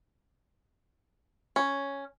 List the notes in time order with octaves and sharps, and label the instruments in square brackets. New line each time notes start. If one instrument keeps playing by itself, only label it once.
[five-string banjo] C#4